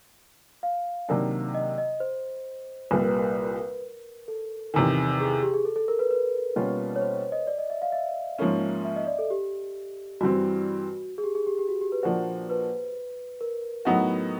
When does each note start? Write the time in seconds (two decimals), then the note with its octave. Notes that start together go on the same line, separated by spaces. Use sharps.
0.63 F5
1.08 C3 D#3 F#3 A#3 D4
1.54 D#5
1.78 D#5
2.00 C5
2.91 C2 A#2 G3 A#3 B4
3.07 B4
3.21 A#4
4.28 A4
4.74 E2 C3 D#3
5.20 G#4
5.30 G#4
5.43 G4
5.54 G#4
5.65 A4
5.76 A4
5.88 A#4
5.99 B4
6.11 B4
6.56 B2 G3 A#3 C#4 F4
6.96 C#5
7.02 C5
7.32 D#5
7.47 D5
7.58 D#5
7.70 E5
7.82 F5
7.92 E5
8.39 G#2 F3 A#3 C#4
8.85 E5
8.96 D#5
9.07 D5
9.19 A4
9.30 G4
10.21 G2 E3 G3 C4 E4 F#4
11.18 G#4
11.24 G4
11.35 G#4
11.47 G4
11.58 G4
11.69 F#4
11.81 G4
11.92 B4
12.03 A#2 F3 A#3 D4 F#4 C5
12.50 B4
13.41 A#4
13.85 A2 F#3 B3 D#4 F#4